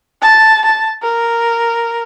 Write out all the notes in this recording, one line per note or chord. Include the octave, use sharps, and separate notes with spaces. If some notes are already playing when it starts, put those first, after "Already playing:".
A5
A5
A#4